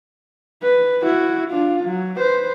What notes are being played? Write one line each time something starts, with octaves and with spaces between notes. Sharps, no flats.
B4
E4 F#4
D4 F4
F#3
B4 C5